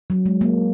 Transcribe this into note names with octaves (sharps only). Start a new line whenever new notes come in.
F#3
G#3
A#3